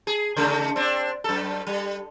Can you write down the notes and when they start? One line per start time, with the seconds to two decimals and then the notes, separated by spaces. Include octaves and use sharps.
0.07 G#4
0.37 C#3 A3
0.76 C4 D4
1.24 F#2 A4
1.67 G3